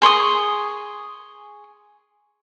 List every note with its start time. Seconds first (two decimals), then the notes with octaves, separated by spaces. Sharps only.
0.02 G#4 C6 C#6 D#6